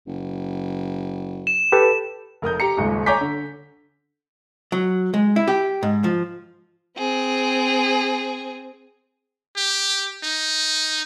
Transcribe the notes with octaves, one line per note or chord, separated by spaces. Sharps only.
F#1
E7
G4 A4 B4
F1 A#4 D#6 G6
G4 A#5 C#7
D#1 G#1 C#2
C#5 G#5 A#5 D6 G6 B6
D3
F#3
G#3
E4
G4
G#2
F3
C4 G#4
G4
D#4